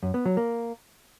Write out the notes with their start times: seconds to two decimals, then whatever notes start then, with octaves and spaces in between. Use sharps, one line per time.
0.03 F#2
0.14 B3
0.26 F#3
0.37 A#3